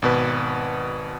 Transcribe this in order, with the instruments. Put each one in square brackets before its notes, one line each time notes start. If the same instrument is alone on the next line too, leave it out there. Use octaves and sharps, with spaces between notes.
[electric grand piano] G#1 B2 B4